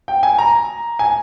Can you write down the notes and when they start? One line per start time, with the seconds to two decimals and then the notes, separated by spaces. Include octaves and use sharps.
0.08 G5
0.23 G#5
0.39 A#5
0.99 G#5